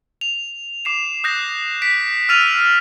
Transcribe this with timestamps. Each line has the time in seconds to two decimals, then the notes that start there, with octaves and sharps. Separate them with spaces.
0.21 F7
0.85 D6 C7 E7
1.24 D#6 F#6 G6 A#6 C7 E7
1.82 B6 D7
2.29 E6 F6 A6 D#7 F7